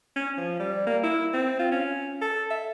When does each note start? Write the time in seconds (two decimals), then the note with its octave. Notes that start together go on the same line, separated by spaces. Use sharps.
0.16 C#4
0.37 F3
0.59 G3
0.87 A#3
1.03 E4
1.33 C4
1.59 F4
1.72 C#4
2.22 A4
2.50 E5